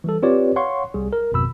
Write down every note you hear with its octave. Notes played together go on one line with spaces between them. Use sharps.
E3 G3 A4
C4 F4 G4 B4 C#5 D5
C#5 F5 F#5 C6 C#6
C2 G3 G#4
A#4
G#1 F2 B2 B5 E6